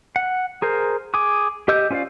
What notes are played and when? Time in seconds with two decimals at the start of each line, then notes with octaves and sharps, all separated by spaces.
0.16 F#5
0.62 G#4 A#4 C5
1.14 G#4 D6 D#6
1.68 G4 D#5 E6 G6
1.91 C#4 F4 C5 D5 F5